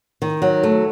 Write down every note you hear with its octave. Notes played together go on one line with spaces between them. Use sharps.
D#3
F#3
A3